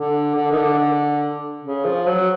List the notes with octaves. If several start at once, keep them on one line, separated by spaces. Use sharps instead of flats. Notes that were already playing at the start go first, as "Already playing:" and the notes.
Already playing: D3
D3
D#3
D3
D3
C#3
F3
F#3